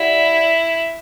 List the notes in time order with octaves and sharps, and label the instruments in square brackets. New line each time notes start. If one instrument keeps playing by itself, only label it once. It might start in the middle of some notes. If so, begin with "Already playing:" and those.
Already playing: [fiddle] E4 [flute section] G4 D5 F#5 B5